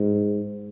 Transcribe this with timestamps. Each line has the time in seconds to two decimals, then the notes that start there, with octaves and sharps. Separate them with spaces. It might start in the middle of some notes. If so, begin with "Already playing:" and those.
Already playing: G#2